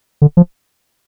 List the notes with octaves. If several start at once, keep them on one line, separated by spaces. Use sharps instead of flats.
D3
F3